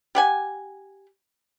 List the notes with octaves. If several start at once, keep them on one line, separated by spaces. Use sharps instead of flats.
G4 F#5 G#5